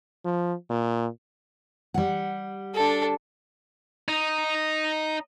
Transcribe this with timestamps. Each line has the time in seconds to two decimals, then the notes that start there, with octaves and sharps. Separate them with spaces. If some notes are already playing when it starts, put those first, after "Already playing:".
0.25 F3
0.70 A#2
1.94 G3 F#5
2.75 D4 A4
4.09 D#4